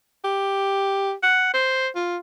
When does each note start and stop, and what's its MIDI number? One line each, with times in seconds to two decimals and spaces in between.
0.25 1.14 67
1.23 1.52 78
1.54 1.89 72
1.95 2.18 65